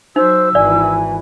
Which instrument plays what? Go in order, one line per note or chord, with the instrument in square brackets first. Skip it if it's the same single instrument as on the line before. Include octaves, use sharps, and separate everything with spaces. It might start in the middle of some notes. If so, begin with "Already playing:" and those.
[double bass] F#3 [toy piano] D#4 [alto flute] C5 [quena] E6
[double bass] G#1 E3 [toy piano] D5 [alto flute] G#5